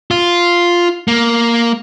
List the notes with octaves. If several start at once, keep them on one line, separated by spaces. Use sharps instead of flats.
F4
A#3